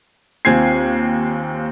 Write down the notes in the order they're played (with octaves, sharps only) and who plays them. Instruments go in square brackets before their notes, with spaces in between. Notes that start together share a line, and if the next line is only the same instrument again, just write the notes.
[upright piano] D#2 C4 F4 G#5 G#6 C7